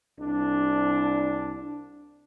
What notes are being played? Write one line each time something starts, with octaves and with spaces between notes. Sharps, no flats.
C2 D4